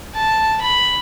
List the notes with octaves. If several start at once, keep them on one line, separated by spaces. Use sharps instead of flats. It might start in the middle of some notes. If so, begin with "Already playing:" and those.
A5
B5